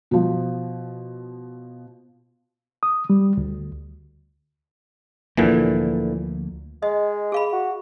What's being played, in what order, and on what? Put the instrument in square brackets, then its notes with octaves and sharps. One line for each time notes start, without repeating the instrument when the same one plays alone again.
[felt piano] B2 F3
[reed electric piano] D#6
G3
D2
[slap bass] D2 F3 A#3 [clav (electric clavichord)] A#2 D3 E3
[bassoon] G#3 [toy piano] D#5
[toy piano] G#4 F5 B5
[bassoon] F#4